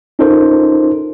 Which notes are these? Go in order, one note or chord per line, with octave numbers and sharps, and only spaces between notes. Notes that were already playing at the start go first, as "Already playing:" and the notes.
C#4 D#4 F4 A4 A#4 C5